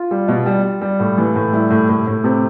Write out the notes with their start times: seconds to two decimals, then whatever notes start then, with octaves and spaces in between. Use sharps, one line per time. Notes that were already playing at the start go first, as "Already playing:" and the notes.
Already playing: F4
0.11 G3
0.28 B2
0.46 G3
0.64 G3
0.81 G3
1.00 A2
1.18 E3
1.35 A2
1.52 G3 E4
1.71 A2
1.89 A2
2.07 A2
2.24 C3